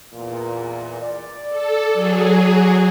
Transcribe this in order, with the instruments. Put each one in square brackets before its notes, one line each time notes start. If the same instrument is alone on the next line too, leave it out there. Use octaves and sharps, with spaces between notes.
[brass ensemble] E2 A#2
D5
[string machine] A4
F#3 G#4